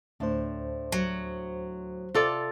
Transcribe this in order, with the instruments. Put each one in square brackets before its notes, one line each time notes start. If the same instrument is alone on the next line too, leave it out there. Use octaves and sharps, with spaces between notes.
[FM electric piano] D2 C5 [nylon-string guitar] A2 D4
[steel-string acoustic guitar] F#3
[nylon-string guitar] C3 [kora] F4 A4 D5